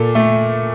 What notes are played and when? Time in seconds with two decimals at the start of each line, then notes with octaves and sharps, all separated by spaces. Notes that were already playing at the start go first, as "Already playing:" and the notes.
Already playing: A#2 A4
0.15 A3